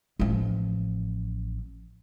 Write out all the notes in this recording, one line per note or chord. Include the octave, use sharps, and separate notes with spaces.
A1 F3